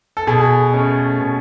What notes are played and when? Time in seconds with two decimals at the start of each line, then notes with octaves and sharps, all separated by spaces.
0.17 A4
0.27 B2 G#4
0.74 A3 C#4
1.20 B2